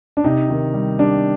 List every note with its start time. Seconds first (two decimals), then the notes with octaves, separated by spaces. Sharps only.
0.17 D4
0.24 C3 D#4
0.50 D#3
0.74 G3
0.99 G3 D4